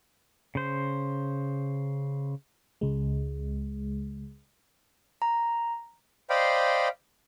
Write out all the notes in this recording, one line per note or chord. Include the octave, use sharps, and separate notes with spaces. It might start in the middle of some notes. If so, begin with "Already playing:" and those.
C#3 C5
C#2 G#3
A#5
C5 D5 D#5 F5 G5 B5